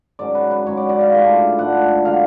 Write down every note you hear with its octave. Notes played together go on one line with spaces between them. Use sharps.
G#2 F#3 C#4 D5
B4
B4
G#2 F#3 C#4 C#5
D5
D5
F5
G#2 F3 A3 D4
G#2 F3 A3 D4 F#5
D3 F#3 F5